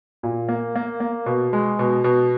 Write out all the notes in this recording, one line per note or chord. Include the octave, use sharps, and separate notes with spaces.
A#2
A#3
A#3
A#3
B2
G#3
B2
B2